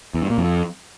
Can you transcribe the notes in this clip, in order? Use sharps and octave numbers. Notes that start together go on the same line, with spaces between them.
E2
G2
A#2
F2